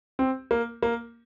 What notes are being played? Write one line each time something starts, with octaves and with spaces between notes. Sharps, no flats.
C4
A#3
A#3